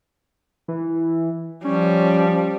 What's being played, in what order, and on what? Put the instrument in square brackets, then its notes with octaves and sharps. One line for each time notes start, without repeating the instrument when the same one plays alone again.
[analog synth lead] E3
[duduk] F3 [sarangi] G3 [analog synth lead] C#4